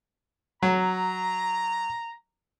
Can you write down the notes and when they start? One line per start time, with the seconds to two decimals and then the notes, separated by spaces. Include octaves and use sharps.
0.63 F#3 A#5